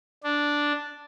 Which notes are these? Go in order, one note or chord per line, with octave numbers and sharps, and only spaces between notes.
D4